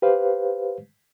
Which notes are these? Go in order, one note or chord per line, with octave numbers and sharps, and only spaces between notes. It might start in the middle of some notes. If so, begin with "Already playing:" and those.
G4 B4 C5 F5